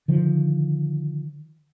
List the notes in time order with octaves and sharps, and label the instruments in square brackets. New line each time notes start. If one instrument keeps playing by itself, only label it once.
[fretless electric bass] D3 D#3 F3